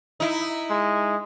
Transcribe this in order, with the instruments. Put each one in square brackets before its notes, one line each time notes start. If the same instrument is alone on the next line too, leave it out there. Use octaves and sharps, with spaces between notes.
[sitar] D#4 E4
[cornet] G#3